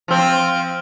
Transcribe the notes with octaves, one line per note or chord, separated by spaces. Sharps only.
F3 C4